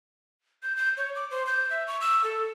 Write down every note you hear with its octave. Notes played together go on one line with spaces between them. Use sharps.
G6
G6
C#5
D6
C5
G6
E5
C#6
E6
A4